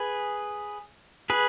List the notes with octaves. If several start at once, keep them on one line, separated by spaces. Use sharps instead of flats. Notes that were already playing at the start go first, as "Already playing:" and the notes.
Already playing: G#4 B4
G#4 B4